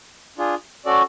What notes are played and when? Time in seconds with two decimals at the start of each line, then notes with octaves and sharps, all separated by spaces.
0.38 D4 F4 G#4
0.85 C#4 F#4 A4 D5